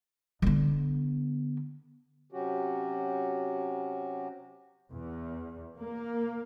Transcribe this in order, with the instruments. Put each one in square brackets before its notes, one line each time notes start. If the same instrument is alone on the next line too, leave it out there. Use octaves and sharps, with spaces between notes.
[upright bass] D3 B3
[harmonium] C3 F#3 C#4 F#4 G4
[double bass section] E2
A#3